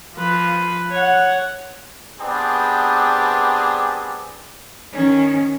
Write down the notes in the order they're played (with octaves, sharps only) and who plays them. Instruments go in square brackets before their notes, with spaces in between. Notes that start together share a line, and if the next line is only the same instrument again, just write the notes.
[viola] F3 B4
C#5 F#5
[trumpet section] B3 C4 D4 G4 G#4
[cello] D#3 C#4